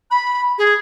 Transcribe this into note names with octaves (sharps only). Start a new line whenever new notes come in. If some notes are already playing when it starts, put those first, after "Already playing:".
B5
G#4